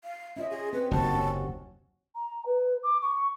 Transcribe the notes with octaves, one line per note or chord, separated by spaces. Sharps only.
F5
C#4 F4 D#5 E5
G#4
C4 B4
F#1 D#2 C3 F#4 A5
C#4
A#5
B4
D6
C#6